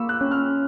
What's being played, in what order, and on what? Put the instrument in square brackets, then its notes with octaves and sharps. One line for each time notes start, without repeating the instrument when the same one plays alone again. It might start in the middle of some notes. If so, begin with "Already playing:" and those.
Already playing: [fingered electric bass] A#3 [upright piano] B5 C#6 D6 E6
[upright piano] F#6
[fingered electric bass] C#4
[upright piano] F6